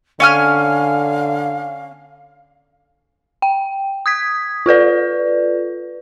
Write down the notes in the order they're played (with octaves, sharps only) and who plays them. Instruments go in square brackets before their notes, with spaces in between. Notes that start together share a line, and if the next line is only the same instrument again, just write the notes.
[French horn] D3 [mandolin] C#4 G#5 F6 [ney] F5
[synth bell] G5
D#6 G#6 B6
F4 A4 B4 D5